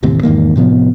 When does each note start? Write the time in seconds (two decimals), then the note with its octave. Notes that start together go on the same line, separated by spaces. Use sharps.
0.03 A1 D#2 A2 C3
0.23 E2 G#2 D#3 A#3
0.56 A2 C3 F3 B3